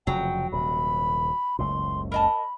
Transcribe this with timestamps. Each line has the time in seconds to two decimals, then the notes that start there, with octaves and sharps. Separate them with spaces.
0.07 F1 C#3 F3 F#3 G5
0.52 D#1 C3 B5
1.59 F#1 C#2 A2 C6
2.12 A#4 D#5 A5 B5